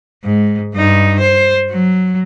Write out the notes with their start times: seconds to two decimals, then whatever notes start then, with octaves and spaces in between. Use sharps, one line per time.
0.24 G#2
0.75 G2 D#4
1.20 C5
1.71 F#3